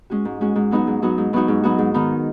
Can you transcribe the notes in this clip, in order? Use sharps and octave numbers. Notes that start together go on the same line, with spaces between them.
G#3 C#4 F#4
G#2
G#3 C#4 F#4
G#2
F#3 B3 D#4 F#4
G#2
F#3 B3 D#4 F#4
G#2
F#3 B3 D#4 F#4
G#2
F#3 B3 D#4 F#4
G#2
D#3 B3 D#4